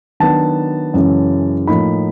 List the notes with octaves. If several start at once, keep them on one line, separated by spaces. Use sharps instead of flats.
D#3 F#3 B3 D4 A5
F#2 C#3 E3 G#3 C#4
A2 F3 A#3 D#4 B5